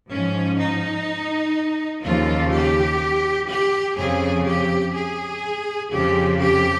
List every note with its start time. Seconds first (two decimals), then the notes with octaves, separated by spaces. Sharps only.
0.10 G#2 F3 C#4
0.58 D#4
2.04 D#2 C#3 F3 F4
2.52 G4
3.49 G4
3.98 F2 C#3 F3 G#4
4.46 G4
4.94 G#4
5.92 F2 C#3 F3 G4
6.40 G4